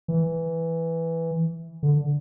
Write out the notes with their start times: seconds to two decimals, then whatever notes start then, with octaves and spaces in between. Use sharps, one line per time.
0.08 E3
1.83 D3